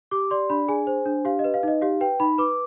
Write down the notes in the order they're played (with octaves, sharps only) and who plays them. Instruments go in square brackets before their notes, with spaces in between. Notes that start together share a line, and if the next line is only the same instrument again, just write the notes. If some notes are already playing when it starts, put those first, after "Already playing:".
[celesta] G4 D6
D5 C6
D4 B5
G#4 G#5
C5
D4
G4 F5
D#5
B4
F5
D#4 D#5
G4 F5
B4 G5
D#4 B5
B4 D6